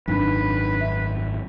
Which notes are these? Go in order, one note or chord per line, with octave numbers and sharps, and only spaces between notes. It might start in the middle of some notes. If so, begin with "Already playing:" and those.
G#1 F#2 D4 D#4 B4 B5
E5